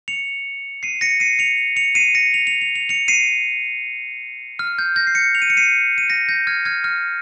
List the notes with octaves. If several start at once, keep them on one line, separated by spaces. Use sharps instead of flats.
C#7 F7
C7 D#7
A#6 C#7
C7 D#7
C#7 F7
C#7 F7
C7 D#7
A#6 C#7
F7
F7
F7
F7
C#7 F7
C7 D#7
F6
G6
G6 A#6
C7
A#6 C#7
F7
D#7
C#7
C7 D#7
D#7
A#6 C#7
G6 A#6
F6 G#6
F6 G#6
F6